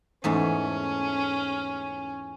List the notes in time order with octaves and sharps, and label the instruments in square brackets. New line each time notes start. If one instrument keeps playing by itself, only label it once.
[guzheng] E2 G#2 A3 [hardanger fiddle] C#4